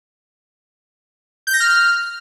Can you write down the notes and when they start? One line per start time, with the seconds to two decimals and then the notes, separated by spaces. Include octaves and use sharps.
1.47 G6
1.54 A#6
1.60 F6